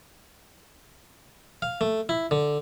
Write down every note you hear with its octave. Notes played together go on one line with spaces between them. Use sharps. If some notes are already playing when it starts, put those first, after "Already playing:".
F5
A3
E4
D3